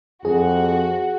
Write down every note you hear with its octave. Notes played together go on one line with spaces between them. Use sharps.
F2 F#4 G#4